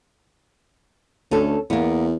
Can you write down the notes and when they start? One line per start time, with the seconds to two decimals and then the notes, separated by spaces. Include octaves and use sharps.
1.31 D2 C#4 A4
1.70 E2 A#3 B3